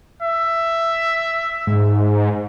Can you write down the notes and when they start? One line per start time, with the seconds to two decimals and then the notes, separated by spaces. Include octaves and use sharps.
0.22 E5
1.67 G#2